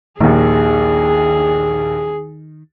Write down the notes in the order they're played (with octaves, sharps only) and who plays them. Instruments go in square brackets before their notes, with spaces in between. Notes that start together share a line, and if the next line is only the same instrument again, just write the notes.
[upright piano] A#1 D#2 [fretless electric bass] D#3 [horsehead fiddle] G#4